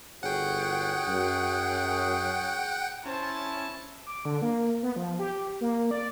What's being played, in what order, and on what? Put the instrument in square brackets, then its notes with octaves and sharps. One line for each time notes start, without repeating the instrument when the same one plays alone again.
[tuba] G1 [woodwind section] C#4 F#4 G#4 [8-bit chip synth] F#5 G5
[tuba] F#2
[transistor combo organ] C#4 [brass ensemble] E4 A5 [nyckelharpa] C5
[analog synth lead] D6
D3
A#3
B3
F3
G4
A#3
D5